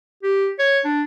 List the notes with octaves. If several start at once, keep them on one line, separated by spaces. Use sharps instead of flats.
G4
C#5
D4